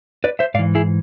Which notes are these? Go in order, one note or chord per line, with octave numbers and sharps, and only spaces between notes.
B4 D5
C5 E5
G#2 E3 D5 F5
E4 G#4